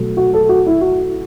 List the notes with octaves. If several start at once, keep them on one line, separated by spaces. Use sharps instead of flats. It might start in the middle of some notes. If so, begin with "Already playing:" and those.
Already playing: B2 F#3 A3
F#4
A4
F#4
E4
F#4